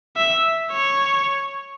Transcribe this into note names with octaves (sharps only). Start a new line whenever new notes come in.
E5
C#5